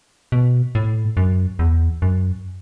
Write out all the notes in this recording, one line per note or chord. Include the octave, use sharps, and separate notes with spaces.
B2
A2
F#2
E2
F#2